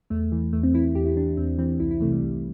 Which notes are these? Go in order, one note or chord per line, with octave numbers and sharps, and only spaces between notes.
E2 A3
E3
E2 A3
C4
E3 E4
E4
E2 G4
E4
E3 D4
E2 C4
E3 C4
C2 E4
E4
C3 E3 A3
G3
C2